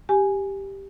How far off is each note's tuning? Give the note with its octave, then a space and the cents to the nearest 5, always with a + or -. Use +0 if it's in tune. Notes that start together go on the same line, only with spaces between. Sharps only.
G4 +0 G#5 +0